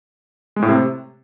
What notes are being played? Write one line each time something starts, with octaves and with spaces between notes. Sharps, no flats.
G#3
A2
C3